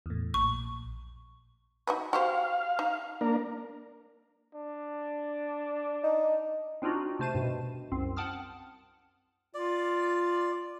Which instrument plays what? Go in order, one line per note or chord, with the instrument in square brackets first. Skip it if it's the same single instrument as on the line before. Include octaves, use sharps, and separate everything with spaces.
[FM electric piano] E2 A2
[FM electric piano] A#1 [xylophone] C#6
[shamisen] D#4 F#4 B4
[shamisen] F#4 G4 C5 [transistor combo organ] F5
[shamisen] D#4
[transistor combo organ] A#3 D4 A#4
[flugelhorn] D4
[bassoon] D#4
[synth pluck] C4 D4 D#4 F4 F#4
C3 A3 C5 A5 D#7 E7
G2 B2
C2 F#2 C4
F#5 G5 A5 D#6 F6
[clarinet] F4 [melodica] D5